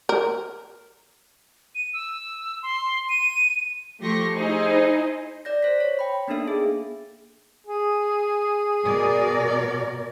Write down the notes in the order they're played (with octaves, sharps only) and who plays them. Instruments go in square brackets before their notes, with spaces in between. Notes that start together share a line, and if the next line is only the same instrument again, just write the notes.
[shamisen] A#4
[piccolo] D#7
E6
C6
D#7
[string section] F3 A3 G4 C6 C#6 A#6
D#4 E4 G#4 C5 D#5 A#5
[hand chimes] D5 G6 A#6
C5 B6
C#5
G5 B5
A#3 B3 D4 D#4 A4 E5
G#4
[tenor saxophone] G#4
[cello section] B2 A#4 D5